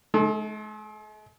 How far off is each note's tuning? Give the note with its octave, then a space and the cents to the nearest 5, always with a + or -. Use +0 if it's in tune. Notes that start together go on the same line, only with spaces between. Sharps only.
G#3 +45 A4 +0